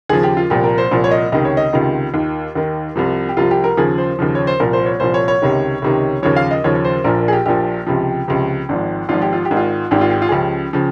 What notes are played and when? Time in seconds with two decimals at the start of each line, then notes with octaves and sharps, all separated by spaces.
0.09 D#2 C#3 F3 G#4
0.23 G4
0.37 F4
0.50 C2 A#2 F3 G4
0.64 A#4
0.78 C5
0.91 C2 A#2 F3
1.04 C#5
1.11 D#5
1.32 C#2 C3 D#3 D#5
1.45 C#5
1.57 D#5
1.73 C#2 C3 D#3 F4
2.14 D#2 D#3
2.55 D#2 D#3
2.96 C2 C3 F3
3.29 G4
3.37 C2 C3 F3 F4
3.51 G4
3.64 A#4
3.77 D#2 C#3 F3 G#4
3.98 C5
4.19 D#2 C#3 F3
4.35 C#5
4.47 C5
4.60 C2 A#2 F3 A#4
4.73 C5
4.86 C#5
5.00 C2 A#2 F3 C5
5.14 C#5
5.28 C#5
5.42 C#2 C3 D#3
5.82 C#2 C3 D#3
6.23 D#2 C#3 F3 C#5
6.36 F5
6.51 D#5
6.64 D#2 C#3 F3 C#5
6.75 C#5
6.85 C5
7.04 A#1 A#2 F3 A#4
7.18 A#4
7.28 G#4
7.33 G4
7.46 A#1 A#2 F3 G4
7.87 C#2 C3 F3
8.28 C#2 C3 F3
8.69 G#1 G#2 F3
9.09 G#1 G#2 F3 F4
9.22 G4
9.33 F4
9.45 G4
9.50 G#1 G#2 D#3
9.57 F4
9.91 G#1 G#2 D#3 G4
10.01 F4
10.11 G4
10.22 F4
10.29 G#4
10.32 C#2 C#3 F3 G4
10.73 C#3 F3